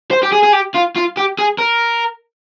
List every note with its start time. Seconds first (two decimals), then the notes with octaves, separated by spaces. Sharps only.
0.11 C5
0.23 G4
0.33 G#4
0.44 G#4
0.53 G4
0.75 F4
0.96 F4
1.17 G4
1.39 G#4
1.59 A#4